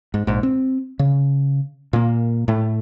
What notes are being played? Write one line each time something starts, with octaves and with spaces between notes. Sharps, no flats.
G#2
A#1 G#2
C4
C#3
A#2 A#3
A2 A3